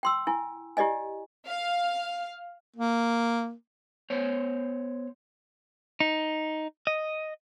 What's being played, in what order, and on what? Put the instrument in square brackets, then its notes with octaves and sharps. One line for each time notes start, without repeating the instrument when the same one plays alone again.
[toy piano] G5 C6 E6
E4 G#5
E4 G4 D5 D#5 G#5
[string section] F5
[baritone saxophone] A#3
[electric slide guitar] B3 C5 C#5
[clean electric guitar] D#4
D#5